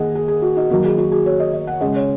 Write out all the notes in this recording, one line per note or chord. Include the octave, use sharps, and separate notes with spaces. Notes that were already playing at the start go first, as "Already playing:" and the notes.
Already playing: D#3 A#3 G#4 D#5 F#5
G#4
G#4
F#4
D#4
D#3 F#3 A#3 F#4
G#4
F#4
G#4
C#5
D#5
D#5
F#5
C#3 G#3 D#5
C#5